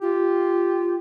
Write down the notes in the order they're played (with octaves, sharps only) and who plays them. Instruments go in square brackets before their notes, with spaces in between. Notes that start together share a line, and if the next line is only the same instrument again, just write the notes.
[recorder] F4 [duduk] G4